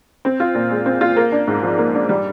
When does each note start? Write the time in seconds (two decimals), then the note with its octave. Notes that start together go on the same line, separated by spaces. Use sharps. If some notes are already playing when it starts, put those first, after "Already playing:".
0.25 C4
0.40 F4
0.55 A#2
0.71 G#3
0.86 C4
1.01 F4
1.16 A#3
1.32 D4
1.48 G#2
1.63 F3
1.78 A#3
1.95 D4
2.09 G3